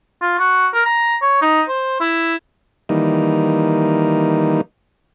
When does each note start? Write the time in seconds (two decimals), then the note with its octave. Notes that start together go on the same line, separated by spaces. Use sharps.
0.22 F4
0.39 F#4
0.74 A#4
0.86 A#5
1.22 C#5
1.42 D#4
1.69 C5
2.01 E4
2.89 D#3 E3 G3 A#3 D#4